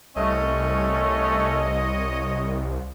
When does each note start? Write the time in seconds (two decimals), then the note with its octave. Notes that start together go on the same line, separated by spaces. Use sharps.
0.16 C2 A3 C#4 C#5 D#5